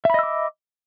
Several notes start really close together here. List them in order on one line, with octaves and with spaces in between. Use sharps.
E5 B5 D#5 E6 D6